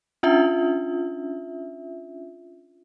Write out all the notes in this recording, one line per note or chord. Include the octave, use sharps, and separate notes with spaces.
C#4 D4 F4 E5